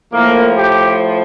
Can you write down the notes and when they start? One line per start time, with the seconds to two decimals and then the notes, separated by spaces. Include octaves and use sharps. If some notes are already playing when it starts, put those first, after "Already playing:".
0.12 A2 F3 A#3
0.55 G4